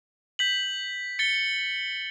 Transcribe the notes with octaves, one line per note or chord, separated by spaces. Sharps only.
G6 B6 F#7
A6 C#7 G7